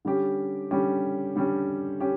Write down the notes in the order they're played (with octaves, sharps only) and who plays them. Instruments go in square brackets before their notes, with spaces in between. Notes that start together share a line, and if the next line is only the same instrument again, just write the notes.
[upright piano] D3 G3 C#4 G4
D3 G3 C#4 G4
D3 G3 C#4 G4
C#4 G4